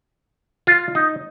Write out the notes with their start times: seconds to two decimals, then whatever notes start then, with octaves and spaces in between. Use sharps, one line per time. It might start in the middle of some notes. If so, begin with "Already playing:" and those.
0.67 F4
0.95 D#4